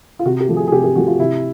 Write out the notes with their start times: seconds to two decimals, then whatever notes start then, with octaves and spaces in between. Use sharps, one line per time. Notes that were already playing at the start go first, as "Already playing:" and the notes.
0.19 F4
0.25 C3 F#4
0.40 G4
0.49 F3 A3
0.56 G#4
0.67 G#4
0.72 C3 G4
0.84 G4
0.96 F3 A3 F#4
1.07 F4
1.19 C3 E4